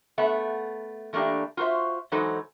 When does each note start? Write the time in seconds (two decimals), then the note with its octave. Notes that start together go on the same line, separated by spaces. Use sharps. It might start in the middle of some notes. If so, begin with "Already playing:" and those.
0.18 A3 B3 E5 F#5
1.13 E3 A3 A#3 D4 G4
1.57 F4 F#4 A#4 C5 E5
2.12 E3 F#3 G#3 D#4 A4 C5